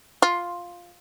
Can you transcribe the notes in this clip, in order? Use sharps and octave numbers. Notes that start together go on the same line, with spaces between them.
F4